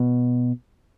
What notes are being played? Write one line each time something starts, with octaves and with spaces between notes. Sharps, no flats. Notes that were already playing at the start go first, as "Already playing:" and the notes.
Already playing: B2